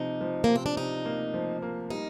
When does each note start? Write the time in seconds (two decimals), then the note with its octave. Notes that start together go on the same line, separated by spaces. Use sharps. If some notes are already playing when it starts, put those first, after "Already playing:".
Already playing: C3 F3 D#4
0.21 F3
0.44 C3 A#3
0.56 C4
0.66 D4
0.77 C3 D#4
1.05 A#3
1.34 F3
1.62 A#3
1.90 G3 D#4